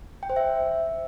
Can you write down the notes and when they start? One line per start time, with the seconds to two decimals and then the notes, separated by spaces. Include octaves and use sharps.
0.23 G5
0.30 C5
0.36 E5